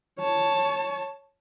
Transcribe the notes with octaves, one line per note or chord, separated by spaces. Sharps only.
C#5 A5